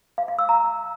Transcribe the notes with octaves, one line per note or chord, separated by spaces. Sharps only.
F5
F5
E6
A#5